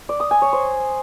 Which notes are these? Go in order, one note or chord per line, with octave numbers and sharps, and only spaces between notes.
D5
D#6
G#5
C#5
C5